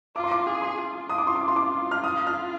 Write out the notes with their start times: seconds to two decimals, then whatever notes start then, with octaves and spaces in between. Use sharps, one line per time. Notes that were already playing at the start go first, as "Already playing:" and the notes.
0.16 F4 D6
0.24 C6
0.31 D6
0.47 G#4
0.62 C6
0.78 F4
1.09 F4 D#6
1.18 D6
1.27 C6
1.35 D6
1.48 C6
1.56 D6
1.91 F6
2.04 D#6
2.27 F6